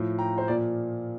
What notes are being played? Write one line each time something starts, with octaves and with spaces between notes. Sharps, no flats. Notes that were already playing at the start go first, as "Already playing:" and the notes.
Already playing: A2 F3
G5 A#5
C5
A#2 F3 D5